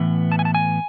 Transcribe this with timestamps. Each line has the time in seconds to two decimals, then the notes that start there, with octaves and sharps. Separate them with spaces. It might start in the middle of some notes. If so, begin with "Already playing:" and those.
Already playing: A2 E3 B3
0.32 A5
0.39 G#5
0.45 A5
0.55 G#5